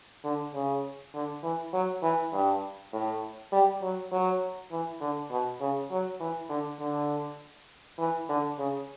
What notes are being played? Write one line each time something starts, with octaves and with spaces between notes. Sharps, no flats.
D3
C#3
D3
E3
F#3
E3
G2
A2
G3
F#3
F#3
E3
D3
B2
C#3
F#3
E3
D3
D3
E3
D3
C#3